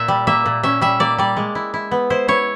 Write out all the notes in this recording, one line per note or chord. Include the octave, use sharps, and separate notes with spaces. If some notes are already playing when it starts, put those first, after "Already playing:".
Already playing: A#2 E5
G3
A#3 E5
A#2
C#4 E5
G3 E5
A#3 D5
G3 D5
G#3
E4
E4
B3
E4 C5
E4 C#5